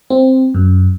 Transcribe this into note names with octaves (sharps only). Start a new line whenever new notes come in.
C4
F#2